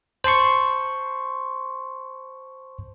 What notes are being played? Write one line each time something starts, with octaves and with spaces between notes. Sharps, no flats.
C5 A5 C6 C#6